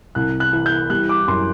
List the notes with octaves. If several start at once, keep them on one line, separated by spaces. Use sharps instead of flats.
C2 F#6
F#6
E3
G6
G3 F#6
D6
F#2 C6